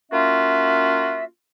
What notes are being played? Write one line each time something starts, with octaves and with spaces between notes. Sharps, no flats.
A#3 C#4 F4 F#4 E5